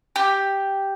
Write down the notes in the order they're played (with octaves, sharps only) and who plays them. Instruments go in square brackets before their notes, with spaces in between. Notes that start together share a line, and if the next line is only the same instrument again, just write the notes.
[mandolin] G4